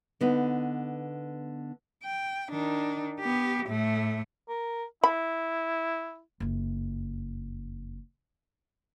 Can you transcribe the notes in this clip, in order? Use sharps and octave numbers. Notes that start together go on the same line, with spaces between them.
D3 B3 D#4
G5
D#3 D4
B3 G4
A2 A3
A#4
E4 B5
F#1 F2